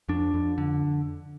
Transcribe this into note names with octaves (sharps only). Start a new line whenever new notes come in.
F2 D4
F2
D3